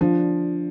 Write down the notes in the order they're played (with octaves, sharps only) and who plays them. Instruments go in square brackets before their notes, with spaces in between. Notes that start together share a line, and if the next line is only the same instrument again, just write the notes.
[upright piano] F3 [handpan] D4